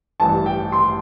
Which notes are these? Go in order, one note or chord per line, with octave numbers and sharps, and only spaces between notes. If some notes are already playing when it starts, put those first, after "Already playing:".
A1 G2 E3 A5
G5
C6